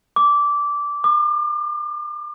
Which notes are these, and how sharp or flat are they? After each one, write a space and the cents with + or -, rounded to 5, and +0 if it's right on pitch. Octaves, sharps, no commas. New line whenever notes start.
D6 -15
D6 +40